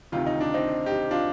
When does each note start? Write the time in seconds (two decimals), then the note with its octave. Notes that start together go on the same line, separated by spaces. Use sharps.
0.12 D2 C3 D#3 F4
0.26 D#4
0.41 D4
0.54 C4 D#4
0.86 D#4 G4
1.11 D4 F4